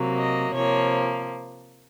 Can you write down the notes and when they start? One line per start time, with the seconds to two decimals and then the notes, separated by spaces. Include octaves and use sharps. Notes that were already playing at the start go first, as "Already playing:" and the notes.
Already playing: C3 F#3 A#3
0.18 D#5
0.54 C3 F3 A#3 C#5